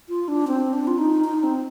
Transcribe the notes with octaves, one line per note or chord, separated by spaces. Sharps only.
F4
D4
C4
D4
F4
D#4
D#4
C4